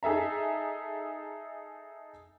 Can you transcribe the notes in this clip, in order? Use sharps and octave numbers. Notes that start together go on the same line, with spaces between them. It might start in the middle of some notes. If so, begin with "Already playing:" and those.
D#4 G#4 A4 E5 A#5